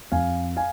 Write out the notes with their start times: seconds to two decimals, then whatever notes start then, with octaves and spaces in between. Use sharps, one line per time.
0.12 F2 F5 G#5
0.57 F5 G#5